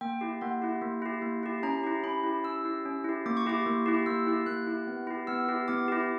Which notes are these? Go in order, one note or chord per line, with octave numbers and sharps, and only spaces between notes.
A#3 G5
E4 G4
A#3 F#5
E4 G4
A#3
E4 G4
A#3
E4 G4
C#4 A#5
E4 G4
C#4 B5
E4 G4
C#4 E6
E4 G4
C#4
E4 G4
A#3 D6
C#6
E4 G4 D6
A#3
E4 G4
A#3 E6
E4 G4
A#3 F#6
E4 G4
B3
E4 G4
B3 E6
E4 G4
B3 D6
E4 G4